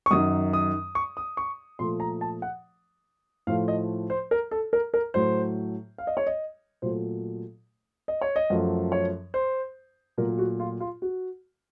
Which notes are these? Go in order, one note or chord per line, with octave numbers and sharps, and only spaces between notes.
C#6
F#2 D#3 F#3 D#6
D#6
C#6
D#6
C#6
A#2 F3 A3 C6
A#5
A5
F#5
A2 F3 A3 F5
D#5
C5
A#4
A4
A#4
A#4
A2 F#3 A3 C5
F5
D#5
C#5
D#5
A#2 F#3 A3 C5
D#5
C#5
D#5
F#2 F3 A3
C#5
C5
A#2 F#3 A3 A#4
F#4
F4
F4
F#4